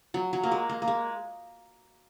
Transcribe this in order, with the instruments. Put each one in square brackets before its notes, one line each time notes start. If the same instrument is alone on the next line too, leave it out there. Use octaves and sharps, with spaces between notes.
[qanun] F#3
F#3
A#3
G#3
A#3
A#3
G#3